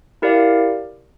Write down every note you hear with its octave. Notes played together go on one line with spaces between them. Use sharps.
E4 G4 A#4 D5 F5